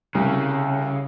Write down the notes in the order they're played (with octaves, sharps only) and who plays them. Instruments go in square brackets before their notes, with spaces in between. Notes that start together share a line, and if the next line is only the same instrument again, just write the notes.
[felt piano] C2 [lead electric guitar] C#3